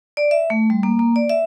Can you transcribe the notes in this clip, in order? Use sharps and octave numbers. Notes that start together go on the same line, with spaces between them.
D5
E5
A3
G3
A#3
A#3
D5
E5